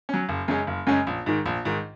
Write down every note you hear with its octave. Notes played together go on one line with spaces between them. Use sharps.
F#3 C#4
F#1
F#2 C#3 G#3 C#4
F#1
F#2 C#3 G#3 C#4
A#1
G#2 D#3
A#1
G#2 D#3